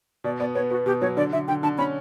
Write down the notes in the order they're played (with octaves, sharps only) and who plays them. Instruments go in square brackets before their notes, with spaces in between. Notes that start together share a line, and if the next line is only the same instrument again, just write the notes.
[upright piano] B2 [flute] D5
[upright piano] B3 [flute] D5
[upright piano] B3 [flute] C#5
[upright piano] B3 [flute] F#4
[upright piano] B2 [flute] G4
[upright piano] F#3 [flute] C#5
[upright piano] D3 [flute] D5
[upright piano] D3 [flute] E5
[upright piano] D3 [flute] G5
[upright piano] D3 [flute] A5
[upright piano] C#4 [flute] B5